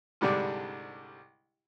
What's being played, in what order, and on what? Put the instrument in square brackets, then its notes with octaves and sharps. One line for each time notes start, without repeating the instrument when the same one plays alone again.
[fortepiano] C2 G#2 D3 G3 D4 D5